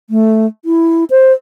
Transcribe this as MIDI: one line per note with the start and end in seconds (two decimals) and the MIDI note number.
0.10 0.46 57
0.65 1.04 64
1.10 1.32 72